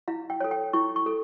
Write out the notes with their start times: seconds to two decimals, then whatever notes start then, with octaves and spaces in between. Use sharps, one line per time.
0.08 E4 F5
0.30 G5
0.40 A4 C#5
0.51 G5
0.73 E4 C#6
0.96 C#6
1.06 A4